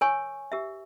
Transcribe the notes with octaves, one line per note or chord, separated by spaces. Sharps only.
A#4 C#5 G#5 C#6
G4 A#4 E5